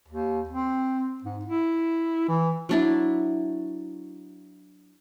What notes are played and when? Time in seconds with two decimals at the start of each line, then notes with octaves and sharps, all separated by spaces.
0.08 D#2
0.49 C4
1.24 G#2
1.45 E4
2.29 E3
2.69 F#3 D4 E4